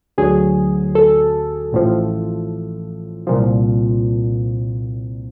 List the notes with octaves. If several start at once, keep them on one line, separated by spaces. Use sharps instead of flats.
D2 D3 F#3 G#4
A4
A1 A2 F3
C2 A#2 F3